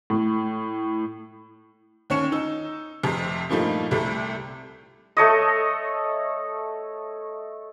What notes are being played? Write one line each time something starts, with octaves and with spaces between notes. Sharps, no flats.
A2
D#2 C#4 C#5 C#7 E7
D#4 E6
F1 F2 C3
G2 A#2 F3 G3 A3 D#4
C2 C3 G3 A3
A3 A4 C#5 D#5